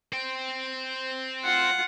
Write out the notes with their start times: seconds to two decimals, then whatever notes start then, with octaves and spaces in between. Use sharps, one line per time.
0.12 C5 G5
1.44 F4 F#5